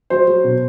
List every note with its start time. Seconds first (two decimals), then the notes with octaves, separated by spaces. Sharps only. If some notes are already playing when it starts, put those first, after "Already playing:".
0.10 F#3 C5
0.27 F#3
0.44 B2